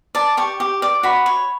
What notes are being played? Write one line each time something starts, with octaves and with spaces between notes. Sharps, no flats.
D5 A5
G4 C#6
G4
D5
F#4 B5
C#5